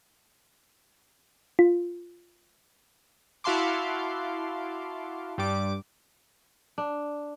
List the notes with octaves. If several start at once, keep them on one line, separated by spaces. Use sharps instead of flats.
F4
E4 F#4 F5 A5 C6 D6
G2 G3 D6
D4